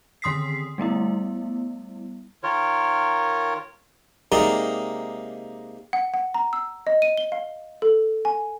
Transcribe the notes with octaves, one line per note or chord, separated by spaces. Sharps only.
D3 D#3 C6 D#6 B6 C7
G3 A3 B3 E4
D#3 F4 A#4 C#5
C3 G#3 A#3 D#4 D5
F#5
F#5
A#5
E6
D#5
D#7
G7
F5
A4
G#5